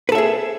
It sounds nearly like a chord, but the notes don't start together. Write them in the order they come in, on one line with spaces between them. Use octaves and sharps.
B4 A4 E5 G#4